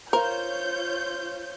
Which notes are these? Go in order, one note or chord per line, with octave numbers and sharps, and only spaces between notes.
F4 A#4 C5 C#5 F5 G6